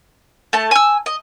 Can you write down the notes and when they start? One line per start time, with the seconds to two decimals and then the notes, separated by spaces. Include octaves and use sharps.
0.53 A3 A5
0.71 G#5 E6
1.06 D#5